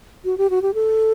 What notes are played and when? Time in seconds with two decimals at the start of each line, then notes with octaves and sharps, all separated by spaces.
0.25 F#4
0.38 G4
0.50 F#4
0.62 G4
0.74 A4